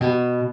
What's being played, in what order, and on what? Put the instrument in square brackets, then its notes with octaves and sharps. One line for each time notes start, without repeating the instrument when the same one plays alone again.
[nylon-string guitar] B2